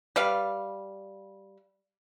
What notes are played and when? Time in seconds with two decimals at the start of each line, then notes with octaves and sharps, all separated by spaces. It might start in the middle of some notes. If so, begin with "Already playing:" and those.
0.16 G3 B4 F5